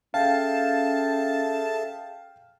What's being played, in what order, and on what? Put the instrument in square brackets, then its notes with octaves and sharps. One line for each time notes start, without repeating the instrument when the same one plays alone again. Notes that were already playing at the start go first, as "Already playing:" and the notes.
[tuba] C#4 [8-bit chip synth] G#4 A4 E5 [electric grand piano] F5 G5 [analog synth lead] A5